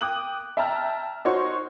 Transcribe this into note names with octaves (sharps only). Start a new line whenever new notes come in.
G5 D6 D#6 F#6 F#7
E5 G5 A5 A#5 F6
D#4 F#4 C5 C#5 C6 C#6